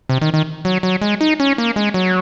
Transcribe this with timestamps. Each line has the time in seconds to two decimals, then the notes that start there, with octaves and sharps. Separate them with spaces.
0.09 C3
0.21 D#3
0.34 D#3
0.65 F#3
0.83 F#3
1.02 G#3
1.21 D#4
1.40 C#4
1.58 A#3
1.76 G#3
1.94 F#3